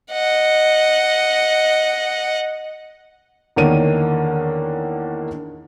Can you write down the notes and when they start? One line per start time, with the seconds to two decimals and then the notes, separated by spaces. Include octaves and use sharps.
0.13 D#5 F#5
3.56 E2 D3 D#3 A#3 C#5 D#7